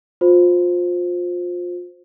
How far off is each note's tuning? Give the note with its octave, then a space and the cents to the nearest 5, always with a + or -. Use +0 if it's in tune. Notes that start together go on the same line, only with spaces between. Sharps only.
F4 +25 C5 +0